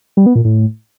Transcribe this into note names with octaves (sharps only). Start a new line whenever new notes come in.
G3
B3
A#2
A2